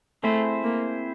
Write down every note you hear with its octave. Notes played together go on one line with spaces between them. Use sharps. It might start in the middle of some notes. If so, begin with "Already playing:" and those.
A3 C4 E4 G#4 C5
A#3